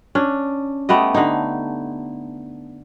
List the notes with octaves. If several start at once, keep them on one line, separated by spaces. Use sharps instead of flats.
C#4 D4
A3 B3 G4 D#5
D3 D#4